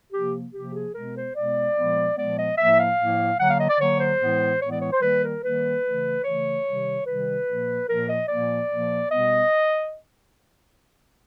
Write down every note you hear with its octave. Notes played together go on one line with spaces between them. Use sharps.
C3 F3 A#3 G4
C3 F3 A#3 G4
G#4
B2 G#3 B3 A#4
C5
B2 G#3 B3 D5
A#2 F3 G#3 B3
A#2 F3 G#3 B3 D5
D#5
A2 F3 A#3 E5
F5
A2 F3 A#3
D3 F#3 A#3 F#5
F5
D#5
D5
D3 F#3 A#3 C#5
C5
A2 E3 G#3 B3
A2 E3 G#3 B3 C#5
D5
C#5
C5
D#3 G3 A#3 B4
A#4
D#3 G3 A#3 B4
C#3 E3 A3
C#3 E3 A3 C#5
C3 D#3 G3
C3 D#3 G3 B4
A#2 F3 A#3
A#2 F3 A#3 A#4
D#5
A#2 F3 A#3 D5
A#2 F3 A#3
B2 G3 B3 D#5